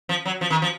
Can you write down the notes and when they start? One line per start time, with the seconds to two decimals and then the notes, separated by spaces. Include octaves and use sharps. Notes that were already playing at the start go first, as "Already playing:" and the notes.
0.09 F3
0.26 F#3
0.41 F3
0.50 D#3
0.62 F3